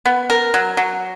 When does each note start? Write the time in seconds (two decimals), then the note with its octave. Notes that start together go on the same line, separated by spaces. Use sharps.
0.06 B3
0.30 A#4
0.54 F#3
0.77 F#3